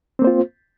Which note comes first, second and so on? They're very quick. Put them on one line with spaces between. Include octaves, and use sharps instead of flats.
C4 A#3 C5 F4